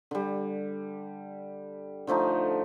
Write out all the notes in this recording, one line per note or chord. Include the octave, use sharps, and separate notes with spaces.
D3 G3
D3 F3 A3 D#4